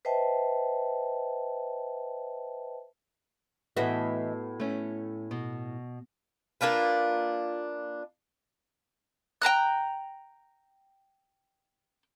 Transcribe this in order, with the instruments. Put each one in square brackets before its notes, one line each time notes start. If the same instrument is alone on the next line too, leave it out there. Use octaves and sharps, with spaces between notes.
[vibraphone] B4 C5 D#5 E5 G5 A5
[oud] A2 B3 F#4 [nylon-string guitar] E3 D#5 E5
[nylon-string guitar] A3 C#4
B2
[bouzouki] A#3 D4 F4 B4
[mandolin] G5 A5 A#5 F#6